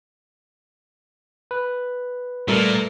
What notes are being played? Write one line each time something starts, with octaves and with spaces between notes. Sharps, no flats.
B4
A#2 G3 A3 A#3 A#4